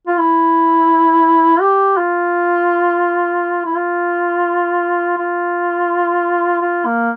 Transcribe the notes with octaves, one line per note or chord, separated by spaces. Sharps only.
F4
E4
G4
F4
E4
F4
F4
F4
A#3